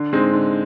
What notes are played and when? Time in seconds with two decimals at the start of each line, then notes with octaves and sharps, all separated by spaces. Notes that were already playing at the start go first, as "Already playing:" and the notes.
Already playing: D3
0.13 G#3 C4 D#4
0.33 D3